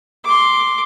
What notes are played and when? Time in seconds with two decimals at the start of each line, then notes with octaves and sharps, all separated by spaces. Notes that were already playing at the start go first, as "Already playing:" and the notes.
0.25 C6 D6